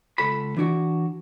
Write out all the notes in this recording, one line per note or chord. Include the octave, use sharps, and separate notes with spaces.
C#2 A4 A5 B5
E3 D4 E4 F#4